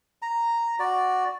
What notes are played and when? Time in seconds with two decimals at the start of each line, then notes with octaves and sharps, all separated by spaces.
0.22 A#5
0.79 F#4 D5